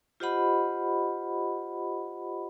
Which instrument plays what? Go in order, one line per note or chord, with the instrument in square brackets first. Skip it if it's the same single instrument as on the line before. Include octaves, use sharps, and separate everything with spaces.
[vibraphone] F4 G4 C5 D#5 F#5 B5